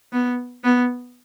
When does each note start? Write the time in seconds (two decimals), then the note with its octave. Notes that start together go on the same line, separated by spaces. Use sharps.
0.13 B3
0.64 B3